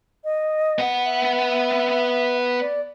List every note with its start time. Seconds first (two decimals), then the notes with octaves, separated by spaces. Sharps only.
0.24 D#5
0.79 B3 F#5
1.06 E5
2.61 D5